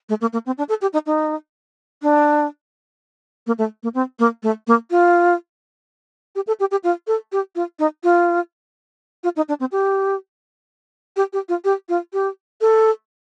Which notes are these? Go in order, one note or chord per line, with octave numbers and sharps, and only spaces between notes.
A3
A#3
A#3
C4
D4
A4
G4
D#4
D#4
D4
A#3
A3
A#3
C4
A#3
A3
A#3
F4
G4
A4
G4
G4
F4
A4
G4
F4
D#4
F4
F4
D#4
D4
C4
G4
G4
G4
F4
G4
F4
G4
A4